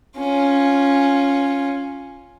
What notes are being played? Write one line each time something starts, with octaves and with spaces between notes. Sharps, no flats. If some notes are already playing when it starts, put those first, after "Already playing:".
C#4 F4